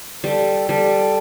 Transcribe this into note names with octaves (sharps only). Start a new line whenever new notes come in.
G3 A4
G3 A4